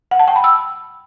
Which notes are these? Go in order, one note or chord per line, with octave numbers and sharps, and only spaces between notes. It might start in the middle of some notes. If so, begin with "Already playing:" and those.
F#5
A5
G5
B5
E6